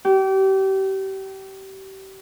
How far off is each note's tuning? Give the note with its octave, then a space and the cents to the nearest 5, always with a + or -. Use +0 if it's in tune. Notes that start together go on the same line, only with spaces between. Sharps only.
G4 -30